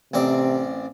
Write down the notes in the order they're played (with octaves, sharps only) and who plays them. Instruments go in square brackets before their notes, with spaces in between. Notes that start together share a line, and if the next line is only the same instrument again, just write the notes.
[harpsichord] A1 C4 D5 [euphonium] C3